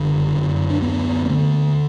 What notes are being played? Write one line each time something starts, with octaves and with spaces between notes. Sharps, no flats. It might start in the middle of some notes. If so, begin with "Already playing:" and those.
Already playing: F#1 D3 D4
F#2
D4
D2 B3
B3
D3 A3